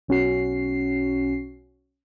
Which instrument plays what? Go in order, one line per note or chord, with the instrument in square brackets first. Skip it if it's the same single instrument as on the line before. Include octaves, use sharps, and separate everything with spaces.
[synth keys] B1 C#4 F#4 C7